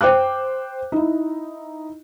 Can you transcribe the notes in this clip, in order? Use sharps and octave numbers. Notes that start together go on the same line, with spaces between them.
C5 G5 D6 F#6
D#4 E4